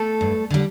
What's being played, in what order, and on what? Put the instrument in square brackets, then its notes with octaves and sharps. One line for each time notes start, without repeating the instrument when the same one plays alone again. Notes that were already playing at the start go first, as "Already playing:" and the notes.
Already playing: [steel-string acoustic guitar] A3 A4
G2
D3 G3